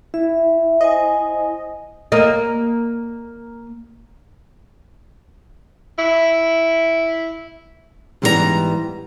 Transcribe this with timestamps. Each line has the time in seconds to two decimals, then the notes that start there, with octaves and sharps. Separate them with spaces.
0.14 E4 E5
0.81 C5 D#5 G#5
2.12 A#3 D#5
5.99 E4
8.22 G#2 E3 G3 B3 G#4 A#5